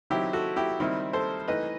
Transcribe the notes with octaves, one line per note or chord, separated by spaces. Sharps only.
D#3 F#3 C4 D#4 E4 G4
F#4 A4
E4 G4
D#3 G3 C4 D#4 E4
A4 C5
E3 A3 D#4 B4 D#5